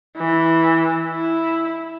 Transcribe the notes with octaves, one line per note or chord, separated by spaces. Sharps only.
E3
E4